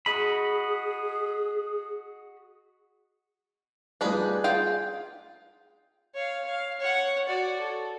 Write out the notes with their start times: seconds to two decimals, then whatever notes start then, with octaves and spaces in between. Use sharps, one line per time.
0.06 F#4 G#4 D#5 B5
4.01 G3 D4 D#4 F4 G#4 B4
4.44 F4 G#4 F5 G5
6.14 C#5 F5
6.47 F5
6.80 C#5 F#5
7.27 F#4 D5
7.60 A4